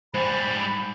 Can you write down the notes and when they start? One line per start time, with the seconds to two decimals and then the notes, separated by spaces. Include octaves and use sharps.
0.14 G#2 G3 C5 B5